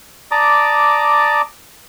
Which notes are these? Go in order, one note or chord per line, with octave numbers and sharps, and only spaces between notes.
D5 A5 A#5 D6 D#6